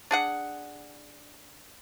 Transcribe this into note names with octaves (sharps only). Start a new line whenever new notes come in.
D4 G#4 F#5